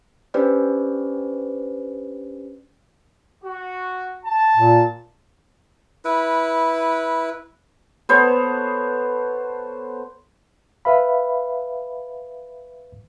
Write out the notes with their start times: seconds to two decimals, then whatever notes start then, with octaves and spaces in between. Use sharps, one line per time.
0.34 C#4 D4 G4 B4 C5 D5
3.44 F#4
4.24 A5
4.57 A#2
6.05 E4 B4
8.09 B3 A4 C5 C#5
10.85 B4 E5 F5 B5